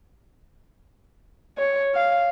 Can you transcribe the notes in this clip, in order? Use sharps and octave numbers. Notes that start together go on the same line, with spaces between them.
C#5
F5